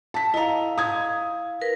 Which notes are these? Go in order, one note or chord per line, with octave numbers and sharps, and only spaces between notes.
A5 B6
E4 D#5 F5 A#5
D#6 G#6
A#4 B4